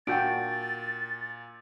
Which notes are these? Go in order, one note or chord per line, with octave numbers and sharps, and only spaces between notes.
A#2 D4 F#4 G5 G6 A6 D7